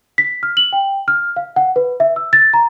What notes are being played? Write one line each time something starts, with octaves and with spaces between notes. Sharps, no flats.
B6
F6
F#7
G5
F6
F5
F#5
B4
E5
E6
A6
A#5